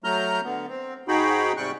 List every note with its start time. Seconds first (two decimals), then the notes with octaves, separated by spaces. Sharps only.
0.04 F#3 A3 A#5 F6 G6
0.44 D3 B3
0.69 C4
1.08 G#2 D#4 F#4 G#4 G5 B5
1.57 G#2 C3 G3 G5 C#6 F#6